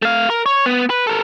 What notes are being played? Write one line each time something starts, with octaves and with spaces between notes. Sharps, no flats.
A3 F5
A#4
C#5
B3
B4
A4 A#4